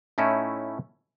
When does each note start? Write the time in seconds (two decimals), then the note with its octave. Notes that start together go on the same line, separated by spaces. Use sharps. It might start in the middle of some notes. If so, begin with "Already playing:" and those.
0.18 A2 A3 C#4 D#4 E4